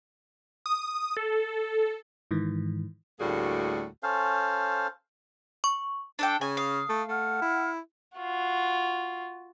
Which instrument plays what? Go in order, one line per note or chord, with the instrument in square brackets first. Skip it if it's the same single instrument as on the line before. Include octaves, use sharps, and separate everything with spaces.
[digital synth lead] D#6
A4
[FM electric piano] G#2 D#3 E3
[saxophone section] D2 A2 G3 A#3 F#4 G#4
[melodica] C#4 A4 C5 F5
[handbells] C#6
[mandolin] D4 A4 G5
[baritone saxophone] C#3 [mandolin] G#5
[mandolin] F5 [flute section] D#6
[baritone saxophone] A3
[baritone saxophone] A3 [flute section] F#5 F6
[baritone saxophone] E4
[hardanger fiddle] F4 F#4